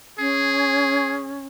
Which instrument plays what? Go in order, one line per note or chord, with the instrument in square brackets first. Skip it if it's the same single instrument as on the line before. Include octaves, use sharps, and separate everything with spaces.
[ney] C#4 [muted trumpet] G#4